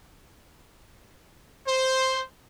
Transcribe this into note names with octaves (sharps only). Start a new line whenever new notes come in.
C5